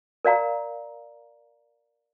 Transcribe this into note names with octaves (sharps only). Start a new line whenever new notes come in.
A#4 D5 F5 A#5